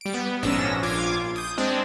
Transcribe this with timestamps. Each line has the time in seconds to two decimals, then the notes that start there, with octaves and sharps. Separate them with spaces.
0.01 G3 D7
0.14 B3
0.43 A#1 G#2 C#4 D4 E6 A#6
0.82 A#1 F4 D6 G#6
1.36 D#6 G6
1.58 G#3 C4 D4